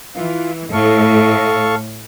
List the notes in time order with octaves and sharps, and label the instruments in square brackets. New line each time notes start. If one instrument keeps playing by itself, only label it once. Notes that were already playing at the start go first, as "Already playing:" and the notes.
[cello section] E3 [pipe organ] F4
[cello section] A2 [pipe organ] A4 F5 C#6